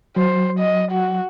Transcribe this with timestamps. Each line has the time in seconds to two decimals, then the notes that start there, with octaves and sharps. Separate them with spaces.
0.16 F#3 C5
0.59 D#5
0.91 F#4